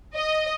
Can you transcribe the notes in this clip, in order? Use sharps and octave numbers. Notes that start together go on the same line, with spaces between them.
D#5